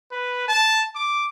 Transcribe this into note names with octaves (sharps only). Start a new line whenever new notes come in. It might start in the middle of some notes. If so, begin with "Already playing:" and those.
B4
A5
D6